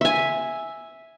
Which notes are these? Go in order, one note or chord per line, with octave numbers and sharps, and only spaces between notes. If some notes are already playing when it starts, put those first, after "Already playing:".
E5 G#5